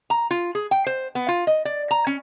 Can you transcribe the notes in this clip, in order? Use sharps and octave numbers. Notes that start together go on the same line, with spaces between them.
A#5
F4
G#4
G5
C5
B3
F4
D#5
D5
A#5
C#4